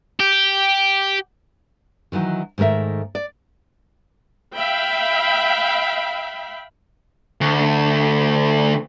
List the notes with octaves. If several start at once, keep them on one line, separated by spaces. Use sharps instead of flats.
G4
D#3 E3 F#3 D#4
G#2 D#3 A3 A#4 E5
D5
E5 F5 G5 B5
D2